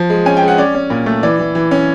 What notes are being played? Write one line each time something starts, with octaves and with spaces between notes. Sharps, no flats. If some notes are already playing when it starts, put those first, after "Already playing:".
Already playing: F3
G#3
C#4 G#5
G5
G#3
F#5
C#4 D5
C#4
A#2
A3
E3 D5
E3
E3
C#4